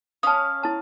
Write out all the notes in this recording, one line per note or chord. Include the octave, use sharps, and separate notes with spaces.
C#4 F5 A5 D#6
E4 A5